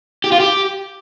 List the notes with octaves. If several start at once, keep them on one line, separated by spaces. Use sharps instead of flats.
G4
F4
G4